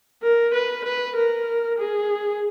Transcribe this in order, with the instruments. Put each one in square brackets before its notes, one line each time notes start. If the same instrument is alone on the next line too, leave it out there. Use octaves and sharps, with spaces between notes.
[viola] A#4
B4
B4
A#4
G#4